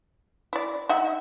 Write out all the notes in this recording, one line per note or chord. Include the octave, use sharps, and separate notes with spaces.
E4 D5
D#4 E5 F#5